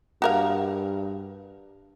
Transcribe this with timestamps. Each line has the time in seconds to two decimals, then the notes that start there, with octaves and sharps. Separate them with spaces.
0.22 G2 F#4 A#4 F5